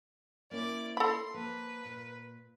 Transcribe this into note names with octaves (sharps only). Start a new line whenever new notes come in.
A#3 C#4 E4 D5 D6
A4 B5 C6
F3 A#3 B4 A5
A#2